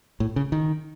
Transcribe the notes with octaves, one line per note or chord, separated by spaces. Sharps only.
A2
C#3
D#3